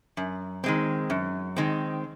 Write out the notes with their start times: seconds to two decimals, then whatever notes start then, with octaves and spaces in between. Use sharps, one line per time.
0.17 F#2
0.64 D#3 G#3 C4
1.10 F#2
1.57 D#3 G#3 C4